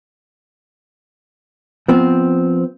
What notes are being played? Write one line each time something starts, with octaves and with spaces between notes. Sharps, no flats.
F3 B3 C4